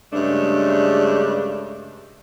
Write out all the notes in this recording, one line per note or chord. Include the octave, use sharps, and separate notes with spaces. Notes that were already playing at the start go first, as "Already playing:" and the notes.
G2 C#3 G#3 A3 D4